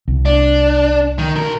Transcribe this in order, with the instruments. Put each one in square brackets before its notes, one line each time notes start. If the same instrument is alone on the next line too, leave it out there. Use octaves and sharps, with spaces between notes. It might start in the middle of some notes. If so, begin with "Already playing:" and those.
[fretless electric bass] C2
[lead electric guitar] D4
D#3
B1 A#4